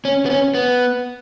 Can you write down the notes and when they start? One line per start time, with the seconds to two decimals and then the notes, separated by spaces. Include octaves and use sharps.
0.05 C#4
0.26 B3
0.30 C#4
0.54 B3